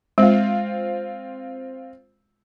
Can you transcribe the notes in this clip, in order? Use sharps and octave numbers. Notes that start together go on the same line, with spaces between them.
G#3 C4 F4